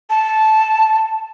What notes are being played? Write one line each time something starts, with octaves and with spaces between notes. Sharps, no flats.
A5